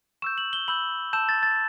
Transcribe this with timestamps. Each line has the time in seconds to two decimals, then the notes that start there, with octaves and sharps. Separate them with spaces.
0.22 C#6 E6 G6 E7
0.38 F#7
0.53 G7
0.68 B5 E6 G6 F#7
1.13 A5 E6 G6 E7
1.29 A6
1.43 A6